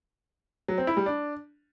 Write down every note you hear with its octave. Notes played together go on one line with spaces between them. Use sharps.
F#3
C4
E4
G3
D4